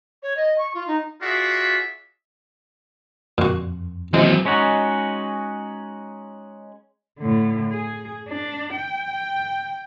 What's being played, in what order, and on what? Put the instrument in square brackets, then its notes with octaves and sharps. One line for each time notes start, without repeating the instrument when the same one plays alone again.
[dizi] C#5
D#5
C#6
F4
D#4
[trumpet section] F4 F#4 G#4 D5 E5
[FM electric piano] F2 [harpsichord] A#2 F#4
[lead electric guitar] D#2 C4 [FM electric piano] E3 F#3 E4 [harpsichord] G#3
[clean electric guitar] G#3 C#4 D#4 F#4
[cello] A2 D3
G#4
D4
G5